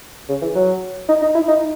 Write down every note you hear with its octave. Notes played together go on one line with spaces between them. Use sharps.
C#3
E3
F#3
D#4
D#4
E4
D#4